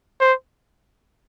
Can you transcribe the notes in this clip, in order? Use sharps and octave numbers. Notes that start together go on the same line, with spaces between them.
C5